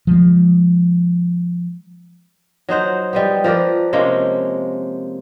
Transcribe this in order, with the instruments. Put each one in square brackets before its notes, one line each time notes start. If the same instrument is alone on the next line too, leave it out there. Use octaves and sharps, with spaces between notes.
[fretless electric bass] F3 G#3
[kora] F#3 D#4 C5 F#5
G3 G#3 B3
F3 A#4 B4 D5
C3 G#3 A#3 C#4